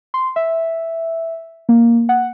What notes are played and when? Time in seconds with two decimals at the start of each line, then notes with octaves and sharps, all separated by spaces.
0.14 C6
0.36 E5
1.69 A#3
2.09 F#5